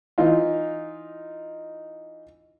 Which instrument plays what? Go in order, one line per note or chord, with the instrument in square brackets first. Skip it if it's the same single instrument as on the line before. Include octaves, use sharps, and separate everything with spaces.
[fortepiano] E3 D#4 F4